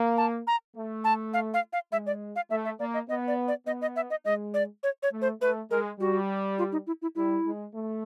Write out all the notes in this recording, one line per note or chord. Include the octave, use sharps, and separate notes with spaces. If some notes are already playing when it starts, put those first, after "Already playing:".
Already playing: A#3
A5
A#5
A3
A5
F5
F5
F5
G#3 E5
D5
F5
A3 E5
E5
A#3 D5
D#5
B3 D#5
D5
D5
B3 D#5
D#5
E5
D#5
G#3 D#5
D5
C#5
C#5
A3
C5
A3 B4
G#3 A#4
G3 F#4
F4
D#4
E4
E4
G3 E4
G#3
A3